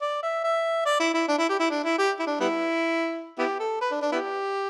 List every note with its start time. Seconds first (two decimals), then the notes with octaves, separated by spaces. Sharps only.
0.02 D5
0.23 E5
0.44 E5
0.86 D5
1.00 E4
1.14 E4
1.28 D4
1.38 E4
1.49 G4
1.60 E4
1.70 D4
1.84 E4
1.98 G4
2.19 E4
2.27 D4
2.40 G3 B3 E4
3.38 B3 E4 G4
3.60 A4
3.81 B4
3.91 D4
4.02 D4
4.12 B3 E4 G4